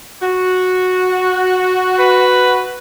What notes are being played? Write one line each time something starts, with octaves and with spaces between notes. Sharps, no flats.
F#4
B4